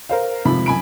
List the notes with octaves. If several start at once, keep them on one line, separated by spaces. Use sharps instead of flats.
A#4 C5 F5
G#1 F2 C3 F3 B5
F#2 G#5 B5 D7